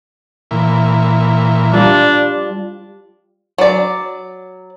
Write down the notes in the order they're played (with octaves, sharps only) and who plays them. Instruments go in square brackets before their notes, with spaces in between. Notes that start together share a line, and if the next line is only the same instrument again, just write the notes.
[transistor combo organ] A#2 E3
[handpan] G3 F4 [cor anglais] D4
[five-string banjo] F#3 D5